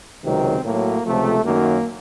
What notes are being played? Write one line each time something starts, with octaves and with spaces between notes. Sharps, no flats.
C#2 C3 D#3 F#3 C4
A2 F#3 A#3
C#2 C3 F3 A3
F#2 D#3 F#3 A#3